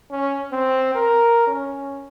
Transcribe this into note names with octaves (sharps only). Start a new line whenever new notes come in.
C#4
C4
A#4
C#4